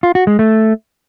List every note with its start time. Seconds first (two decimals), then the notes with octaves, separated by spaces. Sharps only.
0.03 F4
0.15 F#4
0.27 G#3
0.39 A3